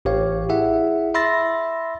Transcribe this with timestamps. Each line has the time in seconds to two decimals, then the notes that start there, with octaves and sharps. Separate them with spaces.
0.05 A1 E3 G4 C#5 F5
0.49 E4 G#4 E5 F#5
1.14 E5 B5 C6 E6 A6 A#6